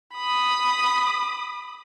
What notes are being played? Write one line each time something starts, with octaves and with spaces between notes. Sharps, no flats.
B5 D#6